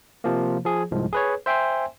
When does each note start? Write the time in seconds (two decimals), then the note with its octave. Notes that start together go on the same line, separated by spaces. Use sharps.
0.24 C3 F3 A#3
0.65 F3 G#4
0.91 C2 G#2 F3 G#3
1.13 G#4 B4 C#5
1.46 C5 E5 G5 G#5 C6